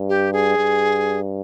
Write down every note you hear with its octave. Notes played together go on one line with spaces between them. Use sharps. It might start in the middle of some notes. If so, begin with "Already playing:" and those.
Already playing: G2
G4
G#4
G2